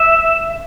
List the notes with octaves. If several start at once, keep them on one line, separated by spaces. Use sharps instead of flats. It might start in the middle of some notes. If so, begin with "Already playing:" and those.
Already playing: E5